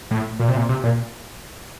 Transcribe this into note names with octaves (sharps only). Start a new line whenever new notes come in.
A2
A#2
C3
A#2
C3
A#2